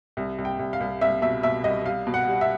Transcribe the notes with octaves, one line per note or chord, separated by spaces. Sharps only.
C2
C2
G5
C2
F5
C2
C2 E5
B2 E5
B2 E5
C2 D#5
G3 F5
B2
F#5
G3
E5